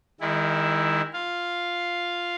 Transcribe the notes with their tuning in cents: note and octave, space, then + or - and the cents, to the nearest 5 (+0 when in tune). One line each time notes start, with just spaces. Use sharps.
D#3 +0 G#3 -40 E4 +0
F4 +0 F5 +0